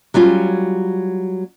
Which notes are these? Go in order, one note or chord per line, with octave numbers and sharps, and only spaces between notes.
F#3 G3 C#4 F4